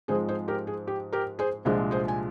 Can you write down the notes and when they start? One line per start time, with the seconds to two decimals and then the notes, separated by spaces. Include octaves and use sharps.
0.08 G#2 F3 G#3 C4 G#4 C5
0.29 G#4 C5
0.48 G4 A#4
0.67 G#4
0.87 G4
1.12 G4 A#4
1.39 G#4 C5
1.65 C2 A#2 F3 G#3 D4 G#4 C5
1.91 G#4 C5
2.08 G#5